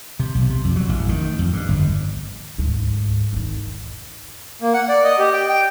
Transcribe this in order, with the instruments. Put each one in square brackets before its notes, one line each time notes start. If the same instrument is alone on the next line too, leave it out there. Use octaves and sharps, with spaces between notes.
[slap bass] C3
B1
C3
F2
F#3
A1
D#3
F2
G2
G1
[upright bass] D2 G#2
E2 D#3
[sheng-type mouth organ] A#3
F#5
D5
D#5
G4
G5
G5